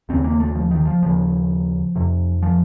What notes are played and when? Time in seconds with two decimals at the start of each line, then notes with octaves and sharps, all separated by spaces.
0.09 D#2 C#3 C4
0.24 A#3
0.40 A3
0.55 F3
0.71 D#3
0.87 F3
1.02 D#2 C#3 F3
1.95 F2 C3
2.43 F3